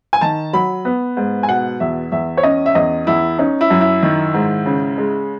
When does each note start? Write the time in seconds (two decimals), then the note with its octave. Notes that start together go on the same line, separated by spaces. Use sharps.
0.13 G#5
0.21 D#3 A5
0.53 F#3 B5
0.85 B3
1.17 G#2
1.43 G#5
1.48 B2 F#5
1.80 E2 E5
2.12 E2 E5
2.37 C#5
2.43 C#4 D#5
2.66 E5
2.75 E2 D#5
3.07 E2 E4
3.38 C#4 D#4
3.61 E4
3.70 F#2
3.81 E4
4.02 D#3
4.34 G#2
4.66 C#3
4.98 G#3